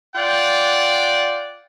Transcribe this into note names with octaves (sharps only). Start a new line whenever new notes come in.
F4 D5 F#5 G5